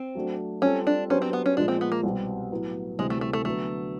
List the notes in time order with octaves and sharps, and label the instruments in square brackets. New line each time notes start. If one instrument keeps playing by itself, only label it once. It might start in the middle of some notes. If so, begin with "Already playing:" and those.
Already playing: [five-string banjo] C4
[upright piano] F#3 A3 D4 F#4
[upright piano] G3 C4 F4 A4 [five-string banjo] C#4
[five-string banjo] D4
[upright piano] F#3 B3 D4 G4 C5 [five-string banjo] C#4
[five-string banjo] C4
B3
C#4
[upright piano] A#2 F3 G#3 [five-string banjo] D4
[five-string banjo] C4
B3
A#3
[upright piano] C2 B2 G3 C4
A2 F#3 B3
[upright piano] D2 C3 E3 G3 C4 [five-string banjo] G#3
[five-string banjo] A3
A3
A3
[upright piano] D3 F#3 B3 [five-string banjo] A3